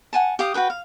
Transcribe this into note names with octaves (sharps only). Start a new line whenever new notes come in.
F#5 G#5 A5
G4 F5 D#6
F#4 G#4 B4 G5
F5